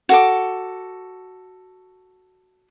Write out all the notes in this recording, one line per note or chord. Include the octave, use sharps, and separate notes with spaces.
F#4 A4 D6